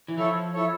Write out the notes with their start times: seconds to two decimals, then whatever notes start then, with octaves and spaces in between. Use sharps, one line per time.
0.08 E3
0.17 F3 E4 A4 C#5
0.53 E4 A4 C#5